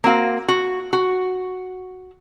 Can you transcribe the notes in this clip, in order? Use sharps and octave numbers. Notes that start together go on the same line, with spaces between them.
A#3 C4 F#4 F5
F#4
F#4